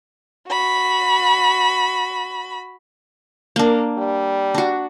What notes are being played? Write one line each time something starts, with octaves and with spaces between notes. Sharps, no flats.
F#4 B5
A#3 D4 A#4
G3
D4 F#4